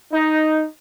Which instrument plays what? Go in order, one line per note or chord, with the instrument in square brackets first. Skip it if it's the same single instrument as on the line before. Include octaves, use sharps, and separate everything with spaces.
[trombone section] D#4